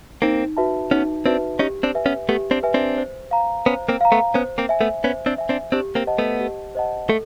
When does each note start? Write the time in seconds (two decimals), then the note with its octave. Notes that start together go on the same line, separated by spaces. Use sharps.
0.22 A#3 C4 D#4
0.57 F#4 B4 E5 A5
0.91 B3 C#4 D#4
1.26 C4 D4 F#4 B4 E5 A5
1.59 C#4 D#4 G4
1.83 C4 D4
1.94 B4 E5 G#5
2.06 B3 C#4
2.29 A3 B3 G4
2.51 C4 D4
2.63 B4 E5 G#5
2.74 C4 D4
2.98 C5
3.31 F5 A#5
3.66 B3 C#4 C5
3.89 A#3 C4
4.01 F5 A#5
4.12 A3 B3
4.34 B3 C#4 C5
4.58 A#3 C4
4.69 E5 G#5
4.81 A3 B3
5.04 B3 C#4 C5
5.26 C4 D4
5.38 E5 G#5
5.49 C4 D4
5.72 C4 D4 G4
5.95 A#3 C4
6.07 C5 D#5 F#5 A5
6.18 A3 B3
6.41 G4
6.75 C5 D#5 F#5 A5
7.09 A3 A4